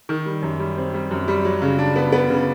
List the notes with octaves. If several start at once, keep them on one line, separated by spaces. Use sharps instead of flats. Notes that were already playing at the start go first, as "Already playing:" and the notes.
D#3
G3
F#2
G3
C4
G3
F#2
G3
F#3
C#3
D4
B3
B3
C#3